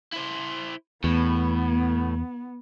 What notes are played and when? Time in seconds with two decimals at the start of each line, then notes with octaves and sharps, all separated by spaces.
0.13 E4 C5
1.04 E2 A2 B3